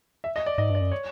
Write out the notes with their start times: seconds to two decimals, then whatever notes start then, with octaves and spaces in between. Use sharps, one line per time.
0.24 E5
0.36 D#5
0.46 D5
0.58 G#2 D#5
0.69 G2
0.75 D5
0.80 F#2
0.92 C#5